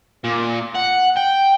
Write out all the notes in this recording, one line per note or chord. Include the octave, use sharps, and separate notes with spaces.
A#2
F#5
G5